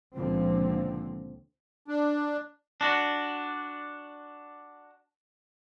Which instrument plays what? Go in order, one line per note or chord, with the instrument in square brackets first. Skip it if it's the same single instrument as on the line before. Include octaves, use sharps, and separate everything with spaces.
[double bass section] C#2 A#2 D3 F3 C4
[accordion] D4
[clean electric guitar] D4 F#4